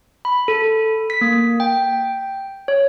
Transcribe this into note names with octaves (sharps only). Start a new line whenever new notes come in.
B5
A4
B6
A#3
G5
C#5